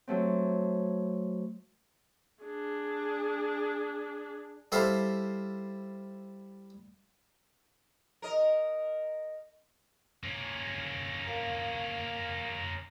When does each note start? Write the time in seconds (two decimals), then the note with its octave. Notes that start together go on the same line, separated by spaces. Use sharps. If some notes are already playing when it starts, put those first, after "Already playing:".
0.07 F#3 A3 C4
2.43 D4 G#4
4.72 G3 E4 A4 C5 F5
8.22 A#4 D#5
10.23 A#3 C#4
11.27 A#4 F5